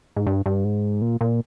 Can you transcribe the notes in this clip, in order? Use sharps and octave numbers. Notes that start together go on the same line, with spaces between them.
G#2
G2
G2
G#2
A#2
A#2